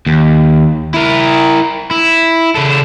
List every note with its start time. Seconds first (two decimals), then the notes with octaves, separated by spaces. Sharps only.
0.06 D#2
0.94 E4 A#4
1.91 E4
2.55 C#3 A4